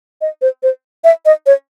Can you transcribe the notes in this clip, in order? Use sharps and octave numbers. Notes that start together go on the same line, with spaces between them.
D#5
C5
C5
E5
D#5
C#5